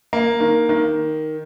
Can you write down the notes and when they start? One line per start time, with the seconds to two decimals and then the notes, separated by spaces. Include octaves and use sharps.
0.13 A#3
0.40 D#3
0.69 D#3